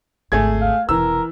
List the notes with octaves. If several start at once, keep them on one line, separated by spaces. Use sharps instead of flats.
G#1 D2 A3 G#4 G#6
F5
F1 B2 E3 A#4 E6